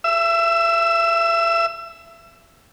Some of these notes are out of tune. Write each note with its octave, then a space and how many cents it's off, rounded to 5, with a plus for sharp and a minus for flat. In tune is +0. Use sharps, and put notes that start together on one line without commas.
E5 +30 E6 +0